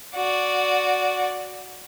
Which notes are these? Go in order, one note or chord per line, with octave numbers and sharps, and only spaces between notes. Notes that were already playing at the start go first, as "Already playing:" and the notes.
F#4 D5